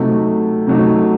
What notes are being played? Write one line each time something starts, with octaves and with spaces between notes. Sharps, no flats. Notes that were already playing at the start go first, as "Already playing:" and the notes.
Already playing: C3 F#3 A3 D#4
C3 F#3 A3 D#4